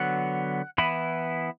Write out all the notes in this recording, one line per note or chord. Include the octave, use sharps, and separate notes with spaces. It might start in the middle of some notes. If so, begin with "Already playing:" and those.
Already playing: D3 F#3 B3 F#5
E3 B3 E4 B5